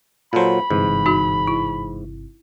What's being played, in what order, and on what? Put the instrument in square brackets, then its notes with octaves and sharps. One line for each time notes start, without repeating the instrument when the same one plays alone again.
[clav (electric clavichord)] A#2 F#3 [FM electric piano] F4 A4 C5 [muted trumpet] B5
[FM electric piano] G1 C3 E3 [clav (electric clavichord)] G#2
[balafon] D#4 F#4
E4